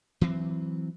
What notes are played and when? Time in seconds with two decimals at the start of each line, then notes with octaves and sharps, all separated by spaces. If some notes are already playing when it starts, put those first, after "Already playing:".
0.21 E3 F#3 C4